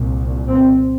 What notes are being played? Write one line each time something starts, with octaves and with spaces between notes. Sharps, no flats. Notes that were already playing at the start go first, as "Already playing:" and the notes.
Already playing: C2 A#2
C4